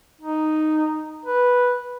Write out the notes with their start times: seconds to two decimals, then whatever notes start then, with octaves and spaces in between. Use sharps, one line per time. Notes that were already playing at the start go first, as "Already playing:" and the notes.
0.21 D#4
1.25 B4